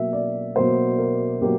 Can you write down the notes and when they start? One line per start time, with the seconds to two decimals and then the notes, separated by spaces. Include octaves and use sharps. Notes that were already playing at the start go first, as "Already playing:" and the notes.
Already playing: B2 F#3 A#3 E5
0.13 D5
0.56 B2 F#3 A#3 C5
0.98 A#4
1.41 B2 F#3 A#3 G4